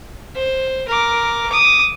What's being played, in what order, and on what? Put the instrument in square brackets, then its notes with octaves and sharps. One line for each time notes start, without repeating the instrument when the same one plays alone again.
[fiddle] C5
A#4 D6
D6 D#6